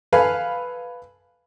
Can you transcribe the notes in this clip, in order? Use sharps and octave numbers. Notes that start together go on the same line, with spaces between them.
A4 B4 F5 G#5 B5